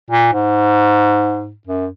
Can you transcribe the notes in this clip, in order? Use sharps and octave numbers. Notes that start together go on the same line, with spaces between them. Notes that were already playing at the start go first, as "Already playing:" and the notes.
A#2
G#2
F#2